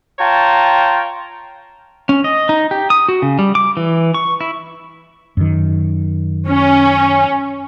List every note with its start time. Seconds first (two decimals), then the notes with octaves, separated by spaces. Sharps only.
0.19 F4 C#5 G5 A5 A#5
2.09 C#4
2.24 D#5
2.49 D#4
2.71 G4
2.90 D#6
3.09 F#4
3.22 C#3
3.39 G3
3.55 D6
3.77 E3
4.14 C#6
4.41 E4
5.37 F#2 D#3
6.49 C#4